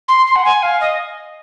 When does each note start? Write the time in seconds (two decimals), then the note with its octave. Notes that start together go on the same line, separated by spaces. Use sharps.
0.08 C6
0.26 C6
0.35 F#5
0.45 G#5
0.63 F5
0.81 D#5